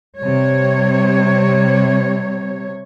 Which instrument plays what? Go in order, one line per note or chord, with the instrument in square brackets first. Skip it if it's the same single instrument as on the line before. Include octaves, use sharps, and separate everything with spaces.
[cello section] C3 G3 C#5